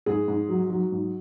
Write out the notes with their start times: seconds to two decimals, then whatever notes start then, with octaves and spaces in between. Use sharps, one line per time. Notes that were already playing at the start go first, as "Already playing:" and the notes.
0.06 G#2 G#4
0.28 G#2
0.49 F#3
0.70 F#3
0.92 G#2